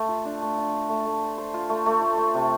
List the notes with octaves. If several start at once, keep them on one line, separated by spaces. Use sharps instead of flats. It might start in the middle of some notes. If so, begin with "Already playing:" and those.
Already playing: A3
F4
D4
A3
F4
D4
A3
A3
C5
C5
F4
A3
A3
F4
A3
C3